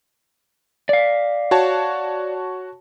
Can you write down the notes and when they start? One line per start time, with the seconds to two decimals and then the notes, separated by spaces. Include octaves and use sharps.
0.89 D5 F5
1.51 F#4 C#5 A5